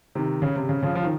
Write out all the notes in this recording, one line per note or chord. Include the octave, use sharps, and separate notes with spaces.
C3 D#3
C#3
C3
C#3
C#3 F3
F3
D#3